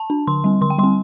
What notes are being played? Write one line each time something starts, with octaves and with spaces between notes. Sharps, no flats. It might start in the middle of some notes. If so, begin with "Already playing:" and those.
Already playing: A5
D4
D3 C6
G3 C4
D3 C6
G5
G3 C6
C4